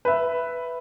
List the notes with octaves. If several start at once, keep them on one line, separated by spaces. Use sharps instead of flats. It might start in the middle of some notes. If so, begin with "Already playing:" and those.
B4 E5